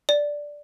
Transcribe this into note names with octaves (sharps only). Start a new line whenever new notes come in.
D5